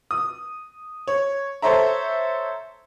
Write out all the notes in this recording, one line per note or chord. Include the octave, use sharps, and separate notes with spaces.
D#6
C#5
A4 C5 C#5 E5 A#5